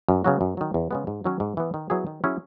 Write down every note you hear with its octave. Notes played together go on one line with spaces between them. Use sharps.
F#2
C#3 F#3 B3 F#4
F#2
D#3 F#3
E2
C#3 G#3 B3
G#2
D#3 F#3 C#4
G#2
E3 B3
D#3
F#3 B3 E4 G#4
D#3
F#3 C#4 E4 G#4